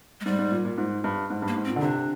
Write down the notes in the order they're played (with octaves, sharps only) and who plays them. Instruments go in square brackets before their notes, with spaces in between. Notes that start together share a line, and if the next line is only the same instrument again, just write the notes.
[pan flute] G#3
[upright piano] G#2 [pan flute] G3
[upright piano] G#2
A#2
A#2
G#2
G2
G#2
G2
[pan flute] A#3
[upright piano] G#2
[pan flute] C4
[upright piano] A#2
D3
[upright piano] C3 [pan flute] D4